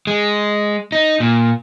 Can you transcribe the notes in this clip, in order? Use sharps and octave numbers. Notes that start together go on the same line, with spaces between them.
G#3
D#4
A#2